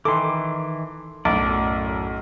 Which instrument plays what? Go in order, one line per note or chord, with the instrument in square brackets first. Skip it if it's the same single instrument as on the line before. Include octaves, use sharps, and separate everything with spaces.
[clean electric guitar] D#3 E3 [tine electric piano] A4 C6 [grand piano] D6
[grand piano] B1 A2 [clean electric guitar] F#2 D5